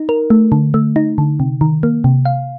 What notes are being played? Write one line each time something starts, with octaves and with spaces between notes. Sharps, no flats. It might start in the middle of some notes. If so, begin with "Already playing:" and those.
Already playing: D#4
A#4
A3
D3
A3
D#4
D3
C3
D#3
A#3
C3
F5